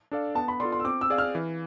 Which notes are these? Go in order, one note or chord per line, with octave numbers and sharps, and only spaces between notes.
D4 A4 D5 F5
B3 A5
B5
F4 A4 D5 C6
C6
E6
C4 D6
E6
G#4 D5 F5
F6
E3